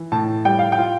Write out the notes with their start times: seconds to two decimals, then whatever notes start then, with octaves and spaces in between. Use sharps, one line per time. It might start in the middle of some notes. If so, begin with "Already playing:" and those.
Already playing: E3
0.12 A2 A5
0.45 G3 G5
0.59 F5
0.72 G5
0.79 F4